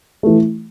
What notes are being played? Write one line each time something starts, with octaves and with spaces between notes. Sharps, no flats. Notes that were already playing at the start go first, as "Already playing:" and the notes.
E3 A3